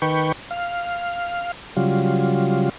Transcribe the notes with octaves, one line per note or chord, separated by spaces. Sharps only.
D#3 B4 G5 C#6
F5
C#3 F#3 G3 F4